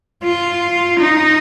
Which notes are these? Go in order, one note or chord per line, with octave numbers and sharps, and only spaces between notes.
F4
D#4